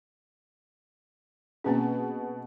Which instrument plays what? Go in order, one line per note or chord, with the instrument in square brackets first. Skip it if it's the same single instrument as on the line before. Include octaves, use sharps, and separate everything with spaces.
[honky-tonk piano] B2 G#4 [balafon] A#3 C4 C#4